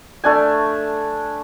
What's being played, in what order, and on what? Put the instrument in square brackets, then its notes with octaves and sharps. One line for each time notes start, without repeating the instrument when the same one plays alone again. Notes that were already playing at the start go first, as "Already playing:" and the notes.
[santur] A3 D4 G#5